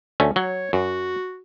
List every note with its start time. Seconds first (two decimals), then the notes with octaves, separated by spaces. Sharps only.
0.20 D2 A3 C#4
0.36 F#3 C#5
0.73 F#2 F#4